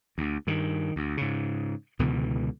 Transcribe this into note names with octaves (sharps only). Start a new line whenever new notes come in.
D2
G2 D#3
D2
G#2 C#3
C#2 B2 D3 E3